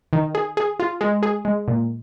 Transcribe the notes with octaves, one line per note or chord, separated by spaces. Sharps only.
D#3
G#4
G#4
F4
G#3
G#4
G#3
A#2